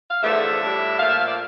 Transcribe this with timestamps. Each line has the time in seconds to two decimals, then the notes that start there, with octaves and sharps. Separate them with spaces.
0.11 F5
0.23 E2 D3 F3 A3 E5
0.62 A2 G3 D4
0.99 A#2 F3 A3 F5
1.09 E5
1.19 F5
1.28 D5